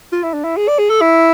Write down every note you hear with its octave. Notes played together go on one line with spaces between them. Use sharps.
F4
E4
D4
E4
G#4
D5
G#4
A4
E4